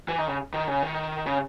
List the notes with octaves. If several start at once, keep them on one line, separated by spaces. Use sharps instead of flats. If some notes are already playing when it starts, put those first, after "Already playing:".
E3
D#3
C#3
D#3
C#3
D#3
C#3